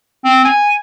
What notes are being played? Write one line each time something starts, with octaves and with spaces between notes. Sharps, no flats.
C4
G#5